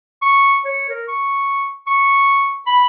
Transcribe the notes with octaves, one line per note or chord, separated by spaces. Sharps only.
C#6
C#5
A#4
C#6
C#6
B5